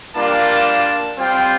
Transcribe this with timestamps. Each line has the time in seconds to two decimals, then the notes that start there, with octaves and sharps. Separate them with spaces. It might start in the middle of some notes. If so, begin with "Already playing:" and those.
0.14 G3 A#3 D4 F4 A5
1.17 G3 C4 F4 G5